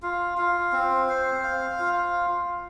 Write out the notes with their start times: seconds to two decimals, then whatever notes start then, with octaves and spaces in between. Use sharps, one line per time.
0.02 F4
0.38 F4
0.73 C4
1.09 C5
1.44 F5
1.79 F4